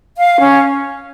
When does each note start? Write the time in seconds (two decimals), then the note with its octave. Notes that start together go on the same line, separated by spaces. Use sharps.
0.17 F5
0.39 C#4